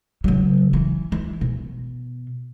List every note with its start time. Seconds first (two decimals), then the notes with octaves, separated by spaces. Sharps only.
0.24 C#3 F#3
0.73 E3
1.12 E3
1.41 B2